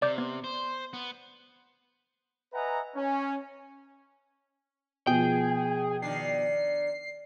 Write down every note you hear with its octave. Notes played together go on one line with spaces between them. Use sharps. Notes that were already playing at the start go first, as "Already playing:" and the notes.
C3 D5 D6 G6
B3
C5
B3
B4 D#5 E5 F#5 G#5 A#5
C#4
B2 F3 G#4 G5
D#3 D4 C7